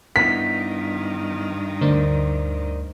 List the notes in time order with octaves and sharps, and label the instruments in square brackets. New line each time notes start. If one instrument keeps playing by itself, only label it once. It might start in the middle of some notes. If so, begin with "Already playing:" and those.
[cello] G2 D#3 [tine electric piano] B3 E4 [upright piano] B6
[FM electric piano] D2 [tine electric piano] A#4 C5 D5